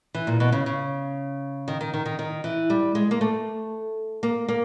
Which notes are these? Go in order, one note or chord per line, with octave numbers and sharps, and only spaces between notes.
E3
A#2
B2
C#3
C#3
D#3
D#3
D#3
D#3
D#3
E3
G3
G#3
A#3
A3
A#3
A#3